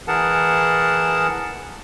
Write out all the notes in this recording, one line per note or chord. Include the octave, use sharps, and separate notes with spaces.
E3 G#4 A#4 F#5 A5